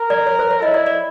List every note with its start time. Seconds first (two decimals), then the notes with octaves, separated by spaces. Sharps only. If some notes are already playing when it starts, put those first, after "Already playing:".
Already playing: A#4
0.10 D5
0.27 C#5
0.39 C5
0.51 C#5
0.62 E4 D#5
0.74 D5
0.86 D5